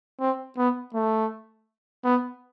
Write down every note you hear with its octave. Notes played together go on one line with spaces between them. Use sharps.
C4
B3
A3
B3